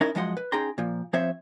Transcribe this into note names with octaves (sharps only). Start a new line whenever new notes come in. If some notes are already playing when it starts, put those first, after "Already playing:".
C#4 D#4 E4 A#4 D#5
F#2 F3 G#3 D#5 F#5 C6
B4
C#4 D#4 G#4 G5 A#5 C6
A#2 F3
F3 C4 C5 C#5 E5